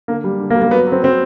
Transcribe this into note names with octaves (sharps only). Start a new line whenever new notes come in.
D3 A#3
G3
D3
A#3
G3
A#3
F#3 B3
F#3
C4
F#3 C4